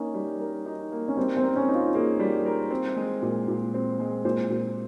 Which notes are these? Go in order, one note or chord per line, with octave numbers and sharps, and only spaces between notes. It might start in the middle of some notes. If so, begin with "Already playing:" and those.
Already playing: A#3 C#4 D#4
G3
A#4
D#4
A#3
C#4
G3 C4
C4
A#4
C#4
D#4
F4
A#3 G#4
G3
A#4
C4
G#3
A#2
A#2
C4
G#3
A#2 C5
A#2